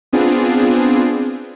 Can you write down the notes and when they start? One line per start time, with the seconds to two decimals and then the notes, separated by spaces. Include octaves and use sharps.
0.13 B3 C4 D4 F4 G#4